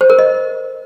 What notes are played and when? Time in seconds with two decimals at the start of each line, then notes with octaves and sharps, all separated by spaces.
0.01 C5
0.10 A#4
0.19 D#5